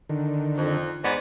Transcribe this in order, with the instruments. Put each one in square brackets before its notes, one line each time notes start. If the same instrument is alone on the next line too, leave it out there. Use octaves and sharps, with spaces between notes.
[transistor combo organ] D3 D#3
[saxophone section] F2
[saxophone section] G#2 B3 [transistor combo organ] D5 D#5